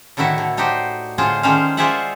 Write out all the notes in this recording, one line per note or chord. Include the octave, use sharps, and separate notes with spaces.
A2 D3 D#3 E4 F#4 E5
D3
D4 D#4 F#4 G4 C5
A2 D3 F4 G#4 C5
D#3 G#3 C#4 D4 C5 F5
F4 G#4 C5 D5 E5 F#5